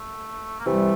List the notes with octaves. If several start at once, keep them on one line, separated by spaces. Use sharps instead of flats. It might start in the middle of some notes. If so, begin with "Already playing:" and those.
Already playing: A3
A#3
C3 E3 G3 A3